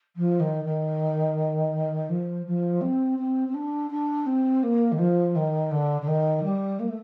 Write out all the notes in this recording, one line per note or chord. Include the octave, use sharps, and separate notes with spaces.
F3
D#3
D#3
F3
F3
C4
C4
C4
D4
D4
C4
A#3
D#3
F3
D#3
D3
D3
D#3
G3
A#3
A3